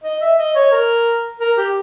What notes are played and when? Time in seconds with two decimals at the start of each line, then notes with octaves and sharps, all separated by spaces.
0.03 D#5
0.21 E5
0.38 D#5
0.55 C#5
0.72 A#4
1.39 A#4
1.57 G4